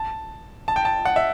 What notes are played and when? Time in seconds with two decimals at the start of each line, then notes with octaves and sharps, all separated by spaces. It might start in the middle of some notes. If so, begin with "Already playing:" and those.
Already playing: A5
0.68 A5
0.76 G5
0.85 A5
1.05 F#5
1.16 E5